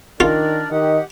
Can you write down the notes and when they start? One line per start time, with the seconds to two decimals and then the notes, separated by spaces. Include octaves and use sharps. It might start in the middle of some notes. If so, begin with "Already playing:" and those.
0.20 D#3 D4 F4 A#4 D5
0.71 D#3 G4 D#5 F#5